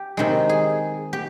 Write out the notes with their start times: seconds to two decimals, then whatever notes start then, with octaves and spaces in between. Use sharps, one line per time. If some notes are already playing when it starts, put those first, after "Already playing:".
Already playing: G4
0.17 C3 D#3 G#3
0.49 G#4
1.13 G4